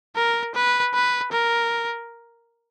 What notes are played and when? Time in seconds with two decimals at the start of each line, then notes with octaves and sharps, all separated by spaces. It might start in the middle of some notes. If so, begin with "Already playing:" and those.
0.16 A#4
0.54 B4
0.94 B4
1.32 A#4